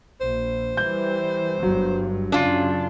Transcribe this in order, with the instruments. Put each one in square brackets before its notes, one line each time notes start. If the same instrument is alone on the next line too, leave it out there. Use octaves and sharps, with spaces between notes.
[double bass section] A#1 [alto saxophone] C5
[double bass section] E3 G3 [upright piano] G6
[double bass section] G1 G2 [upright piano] F#3
[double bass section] F#2 C#3 [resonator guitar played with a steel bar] D4 F4